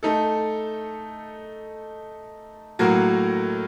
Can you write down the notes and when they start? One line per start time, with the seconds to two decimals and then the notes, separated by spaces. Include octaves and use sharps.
0.03 A3 D#4 A4
2.79 A2 F#3 A#3 F#4 A#4